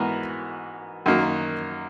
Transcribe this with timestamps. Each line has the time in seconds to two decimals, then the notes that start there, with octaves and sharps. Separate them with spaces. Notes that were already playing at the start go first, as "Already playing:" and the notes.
Already playing: G#2 E3 B3 F#4 A#4
1.06 F#2 D#3 A#3